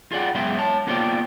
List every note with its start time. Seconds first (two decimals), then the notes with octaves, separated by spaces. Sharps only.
0.11 F4 G#4 D5 F#5 G5
0.35 F#2 G#3 B3 E5 G5 C6
0.58 C#5 A5
0.87 A#3 B3 F4 C5 D5 G5